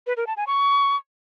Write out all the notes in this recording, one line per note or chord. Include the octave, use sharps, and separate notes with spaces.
B4
A#4
A5
G#5
C#6